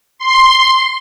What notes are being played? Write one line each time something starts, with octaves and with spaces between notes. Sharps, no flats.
C6